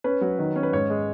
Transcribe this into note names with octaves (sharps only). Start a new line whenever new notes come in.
C#4 B4
F#3
D#3
C#4
B4
G#2 C#5
G#3